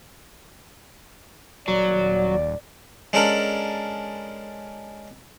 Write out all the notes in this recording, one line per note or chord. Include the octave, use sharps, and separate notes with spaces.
D#1 F#3 D5
G#3 C#4 D4 A4 A#4 F#5